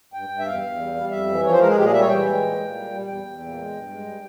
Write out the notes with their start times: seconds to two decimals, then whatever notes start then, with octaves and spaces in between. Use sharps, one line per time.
0.13 G2 G5
0.29 G2
0.39 E5
0.46 E2 F5
0.62 E2
0.79 G3
0.95 G3
1.11 F2 E5
1.27 E3
1.43 F3 C#5
1.52 C5
1.60 G#3 A#4
1.69 G#4
1.76 A#2 G4
1.84 G#4
1.92 G3 E5
2.01 C#5
2.09 E3 G5
2.26 G#3
2.42 A#2
2.59 A#2
2.75 G3
2.91 G3
3.07 E2 G5
3.24 E2
3.40 A#2
3.57 G#3
3.73 G2
3.89 G#3
4.06 G3